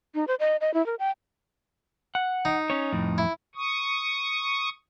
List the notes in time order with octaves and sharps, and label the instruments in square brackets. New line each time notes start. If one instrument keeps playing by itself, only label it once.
[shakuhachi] D#4
C5
D#5
D#5
E4
A#4
G5
[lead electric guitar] F#5
[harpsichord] D#4
[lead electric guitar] C#4 C#5
F2 A2
[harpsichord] E4
[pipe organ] C#6 D#6